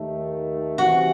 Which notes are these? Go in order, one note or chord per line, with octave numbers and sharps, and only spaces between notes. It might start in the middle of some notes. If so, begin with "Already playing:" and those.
Already playing: D#2 D#3 A3
C2 C3 E3 F#4